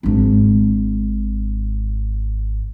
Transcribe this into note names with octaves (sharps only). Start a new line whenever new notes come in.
G#1 D4